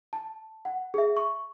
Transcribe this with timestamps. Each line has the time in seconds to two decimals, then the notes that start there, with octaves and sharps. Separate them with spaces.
0.13 A5
0.65 F#5
0.94 G#4 E5
1.17 C#6